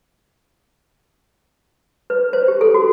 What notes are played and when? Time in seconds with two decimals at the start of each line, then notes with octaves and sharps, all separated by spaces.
2.10 B4
2.33 C5
2.48 G4
2.61 A4
2.74 F#4